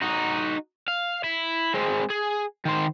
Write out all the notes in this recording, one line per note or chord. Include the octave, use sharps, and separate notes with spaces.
D#4 F#4
F5
E4
G#3 C4
G#4
D#3 C5